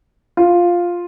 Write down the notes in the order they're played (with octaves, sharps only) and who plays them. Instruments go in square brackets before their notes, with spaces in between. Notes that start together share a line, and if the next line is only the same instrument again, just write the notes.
[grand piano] F4